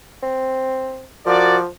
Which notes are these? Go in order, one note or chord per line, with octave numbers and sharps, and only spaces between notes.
C4
F3 F#4 A#4 D5